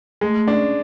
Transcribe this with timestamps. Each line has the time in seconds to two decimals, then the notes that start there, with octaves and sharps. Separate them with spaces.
0.21 G#3 A3
0.48 C#4 D4